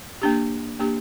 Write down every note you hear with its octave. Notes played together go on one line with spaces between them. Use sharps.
A#3 D4 G4
A#3 D4 G4